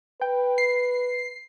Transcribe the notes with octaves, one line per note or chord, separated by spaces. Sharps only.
B4 G5
C7